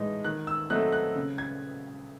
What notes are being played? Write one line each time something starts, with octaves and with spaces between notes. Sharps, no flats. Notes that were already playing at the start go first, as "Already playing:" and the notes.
Already playing: A2 E3 G#3 D#4
D#3 F#6
E6
F#3 A3 C4 D#4 F#6
F#6
C#3
G#6